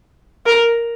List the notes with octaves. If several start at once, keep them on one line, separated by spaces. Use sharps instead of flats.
A#4